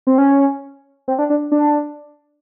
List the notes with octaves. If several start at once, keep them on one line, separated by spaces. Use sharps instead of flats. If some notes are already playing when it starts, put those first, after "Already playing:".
C4
C#4
C4
D4
D4
D4